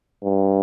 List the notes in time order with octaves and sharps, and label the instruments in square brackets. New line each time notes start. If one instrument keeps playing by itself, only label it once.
[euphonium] G2